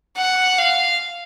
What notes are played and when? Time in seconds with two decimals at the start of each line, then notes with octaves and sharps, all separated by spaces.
0.17 F#5
0.58 F5